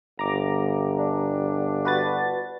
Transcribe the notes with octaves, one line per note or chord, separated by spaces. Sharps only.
G1 A#5 D6
D4
F#4 B4 A6